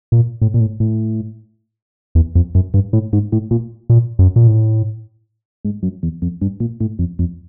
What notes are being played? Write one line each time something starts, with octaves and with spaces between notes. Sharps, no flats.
A#2
A2
A#2
A2
A2
E2
F2
F#2
G2
A2
G#2
A2
A#2
A#2
F#2
A#2
A2
G#2
F#2
E2
F2
G2
A#2
A2
F2
F2